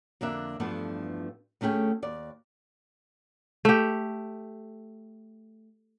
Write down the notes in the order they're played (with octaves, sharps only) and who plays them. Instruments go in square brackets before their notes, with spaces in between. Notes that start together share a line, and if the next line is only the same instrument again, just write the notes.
[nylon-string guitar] F2 D3 A#3 D4 E5
E2 G2 F3 A3 B3 D4
D2 A3 C#4 G#4 G5
D#2 D5
[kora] A3 G4